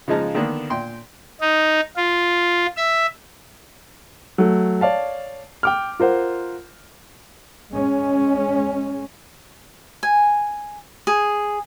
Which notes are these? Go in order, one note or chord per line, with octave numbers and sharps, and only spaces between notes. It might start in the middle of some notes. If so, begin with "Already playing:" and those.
C#3 F3 G#3 D#4 A5
D3 D#3 A#3 B3 D4
A#2 G5 C6
D#4
F4
E5
F#3 A3
C#5 D5 F5 A5
G5 D6 F6
F4 A#4 C5 F#5
G#3 C#4
G#5
G#4